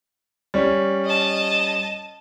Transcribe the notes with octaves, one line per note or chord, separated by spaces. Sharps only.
G3 C#4
D#5 A5